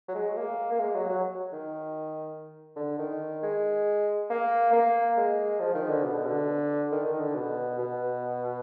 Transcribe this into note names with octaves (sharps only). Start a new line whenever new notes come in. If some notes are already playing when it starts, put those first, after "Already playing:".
F#3
G#3
A#3
A#3
G#3
F#3
F#3
D#3
D3
D#3
G#3
A#3
A#3
G#3
F3
D#3
D3
B2
D3
D#3
D#3
D3
B2
B2